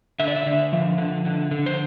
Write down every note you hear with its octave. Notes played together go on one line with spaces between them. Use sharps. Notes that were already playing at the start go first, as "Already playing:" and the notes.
D3 E5
D5
E5
D3
F3
D3
D3
D3
C5